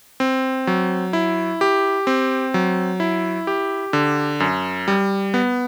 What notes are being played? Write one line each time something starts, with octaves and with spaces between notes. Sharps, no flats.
C4
F#3
E4
G4
C4
F#3
E4
G4
D3
F#2
G3
B3